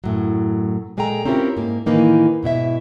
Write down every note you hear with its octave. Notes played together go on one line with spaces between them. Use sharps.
F#2 A2 F#3
A#2 G#3 G#4 A4 G5 A#5
C4 C#4 E4 F4 G4 A#4
G#2 A#3
A2 D#3 E3 A#3 D#4
G#2 B2 E4 E5